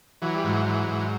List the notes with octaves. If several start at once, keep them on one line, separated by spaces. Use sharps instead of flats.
E3 F#3
G3
G#2 F#3
E3
G#2